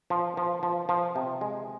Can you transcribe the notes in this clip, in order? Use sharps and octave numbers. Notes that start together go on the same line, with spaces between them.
F3
F3
F3
F3
C3
G#3